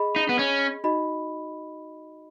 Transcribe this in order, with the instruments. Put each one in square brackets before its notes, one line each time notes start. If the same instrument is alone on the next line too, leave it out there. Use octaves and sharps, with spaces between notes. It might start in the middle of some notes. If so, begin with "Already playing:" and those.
Already playing: [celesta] G#4 D#5 B5
[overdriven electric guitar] D#4
B3
C#4
[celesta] D#4 F#4 D#5 B5